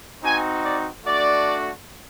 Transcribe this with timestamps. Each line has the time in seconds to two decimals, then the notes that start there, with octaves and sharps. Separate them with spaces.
0.23 C4 D#4 F#4 G#5
0.63 D5
1.05 A3 D4 F#4 D5